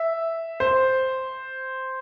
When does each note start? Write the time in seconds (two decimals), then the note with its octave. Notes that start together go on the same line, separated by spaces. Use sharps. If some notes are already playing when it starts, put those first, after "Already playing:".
Already playing: E5
0.60 C5